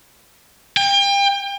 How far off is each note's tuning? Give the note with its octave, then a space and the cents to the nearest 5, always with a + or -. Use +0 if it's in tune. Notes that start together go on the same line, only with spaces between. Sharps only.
G5 +35